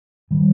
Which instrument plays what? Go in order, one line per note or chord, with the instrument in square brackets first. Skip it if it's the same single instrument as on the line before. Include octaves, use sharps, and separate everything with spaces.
[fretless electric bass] D#3 G3